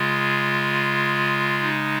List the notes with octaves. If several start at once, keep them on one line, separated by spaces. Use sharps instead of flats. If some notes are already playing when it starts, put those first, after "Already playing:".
Already playing: C#3 G#3 F4
D#4